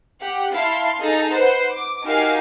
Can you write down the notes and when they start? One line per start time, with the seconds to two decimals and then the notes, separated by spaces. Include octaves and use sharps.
0.21 G4 F#5
0.53 E4 F5 A5 C6
0.98 D#4 G#4 A4 A#5
1.33 B4 C5 F#5
1.73 D6
2.05 D#4 F#4 G4 A#4 F5 G#5